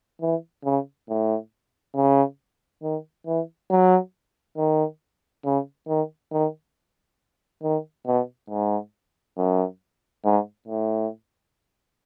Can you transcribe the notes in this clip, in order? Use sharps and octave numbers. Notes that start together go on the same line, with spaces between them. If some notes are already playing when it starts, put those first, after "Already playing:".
E3
C#3
A2
C#3
D#3
E3
F#3
D#3
C#3
D#3
D#3
D#3
B2
G#2
F#2
G#2
A2